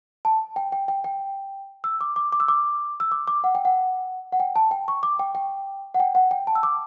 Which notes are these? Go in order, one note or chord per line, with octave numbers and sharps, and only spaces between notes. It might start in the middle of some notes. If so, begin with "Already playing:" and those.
A5
G5
G5
G5
G5
E6
D6
D6
D6
E6
D6
E6
D6
D6
F#5
G5
F#5
F#5
G5
A5
G5
C#6
D6
G5
G5
F#5
G5
F#5
G5
A5
E6
D6